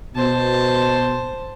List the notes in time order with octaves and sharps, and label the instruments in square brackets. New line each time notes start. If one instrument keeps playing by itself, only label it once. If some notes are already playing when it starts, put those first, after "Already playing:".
[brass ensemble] B2 [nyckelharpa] C5 A5